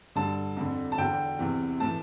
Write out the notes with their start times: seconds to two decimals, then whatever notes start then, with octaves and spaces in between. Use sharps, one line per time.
0.16 G2 D3 A5
0.57 F2 D3
0.92 A5
0.98 E2 D3 G5
1.39 E2 C3 E3
1.80 A2 E3 A5